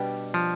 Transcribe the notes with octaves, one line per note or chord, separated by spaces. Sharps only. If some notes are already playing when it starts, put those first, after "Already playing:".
Already playing: B2 G3 D4 G4
F3